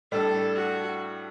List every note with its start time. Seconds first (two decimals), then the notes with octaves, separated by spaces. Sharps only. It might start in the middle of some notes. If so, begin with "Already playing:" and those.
0.12 A2 G3 D4 A4
0.56 F#4